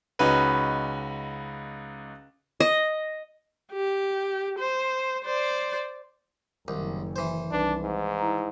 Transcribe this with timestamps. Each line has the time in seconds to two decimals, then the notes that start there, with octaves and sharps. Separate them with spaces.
0.19 C#2 C#4 D#4 F#4 B4 B5
2.60 D#5
3.72 G4
4.59 C5
5.25 C5 D5
6.68 F#1 C2 F#2 D#3
7.16 E3 C5
7.51 C2 D4 D#4 B4
7.82 G#2
8.19 E4 A#5